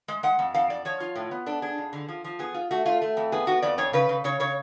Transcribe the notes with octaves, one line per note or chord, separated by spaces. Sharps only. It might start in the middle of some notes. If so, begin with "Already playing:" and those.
G#3
G#3 F#5
F2
F2 F5
F2 D5
F3 C#5
F4
A2
B3
D4 A4
D4 G#4
F2
D3
F3
F3
B3 G#4
F4
A3 F#4
A3 F4
A3
F2
B3 G#4
B3 F#4
F2 D5
F2 C#5
C#3 B4
C#3
C#3 C#5
C#3 C#5